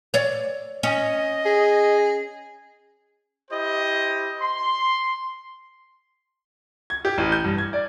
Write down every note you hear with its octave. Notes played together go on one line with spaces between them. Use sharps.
C#5 D5
C#4 D#5
G#4
E4 G4 C5 D#5
C6
G#6
G4
A1
G6
G2
G#6
D5